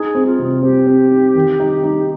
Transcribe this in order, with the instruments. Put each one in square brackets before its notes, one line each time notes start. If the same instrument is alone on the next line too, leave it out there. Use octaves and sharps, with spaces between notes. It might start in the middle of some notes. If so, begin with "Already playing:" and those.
Already playing: [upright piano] D#4 [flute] G#4
[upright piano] C4
[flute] F4
[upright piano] C3
[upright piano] C4 [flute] G4
[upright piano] C4
D#4
D#3
D#4
D#4